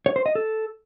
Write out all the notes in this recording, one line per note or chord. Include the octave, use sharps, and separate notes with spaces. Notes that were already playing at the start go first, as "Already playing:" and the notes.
C#5
C5
D#5
A4